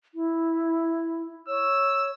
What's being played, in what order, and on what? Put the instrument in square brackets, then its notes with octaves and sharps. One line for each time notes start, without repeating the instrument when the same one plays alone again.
[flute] E4
[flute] C#5 [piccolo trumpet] E6